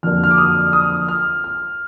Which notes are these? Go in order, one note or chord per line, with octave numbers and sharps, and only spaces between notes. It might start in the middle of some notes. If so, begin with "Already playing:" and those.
F2 D3 F#3 A#3 F6
F6
D6
D#6
D#6
F6
F6